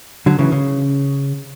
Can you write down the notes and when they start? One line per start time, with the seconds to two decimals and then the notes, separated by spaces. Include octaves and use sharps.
0.26 D3 F#3
0.39 C#3 E3
0.52 C#3